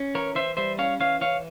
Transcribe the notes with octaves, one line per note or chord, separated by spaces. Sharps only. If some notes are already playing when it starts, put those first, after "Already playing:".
Already playing: C#4
E3 A#4 C#5
E3 C5 E5
G3 C5 E5
C#4 C#5 F5
E3 C#5 F5
E3 C#5 F5